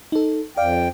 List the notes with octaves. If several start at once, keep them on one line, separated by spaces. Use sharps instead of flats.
D#4 A4
F2 D5 F5 G5